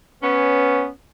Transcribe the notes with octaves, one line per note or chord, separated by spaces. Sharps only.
B3 C#4